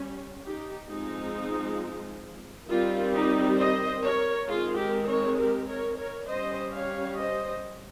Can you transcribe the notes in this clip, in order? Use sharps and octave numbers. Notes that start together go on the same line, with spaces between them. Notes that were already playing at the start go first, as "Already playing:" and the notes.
Already playing: G3 C#4
D#4 G4
F3 G#3 C4 D#4
D#3 G3 C4 F4
D#4 G4
C5 D#5
A#4 C#5
D#3 G#3 C4 F4 G#4
G4 A#4
A#4 C#5
G4 A#4
A#4 C#5
A#4 C#5
G3 C#4 C5 D#5
C#5 F5
C5 D#5